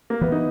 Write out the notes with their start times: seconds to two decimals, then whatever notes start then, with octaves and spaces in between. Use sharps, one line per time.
0.10 A#3
0.21 E3 B3
0.32 D#4